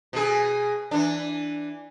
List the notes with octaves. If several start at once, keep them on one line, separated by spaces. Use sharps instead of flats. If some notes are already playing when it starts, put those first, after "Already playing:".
B2 G#4
E3 D4